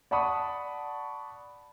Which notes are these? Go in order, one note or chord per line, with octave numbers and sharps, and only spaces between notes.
D5 F#5 A5 B5 C#6 D#6